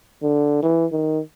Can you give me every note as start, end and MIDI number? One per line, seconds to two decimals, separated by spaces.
0.22 0.62 50
0.62 0.86 52
0.92 1.19 51